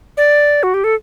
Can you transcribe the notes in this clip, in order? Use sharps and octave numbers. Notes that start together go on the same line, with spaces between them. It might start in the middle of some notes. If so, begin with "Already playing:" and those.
D5
F#4
G4
A4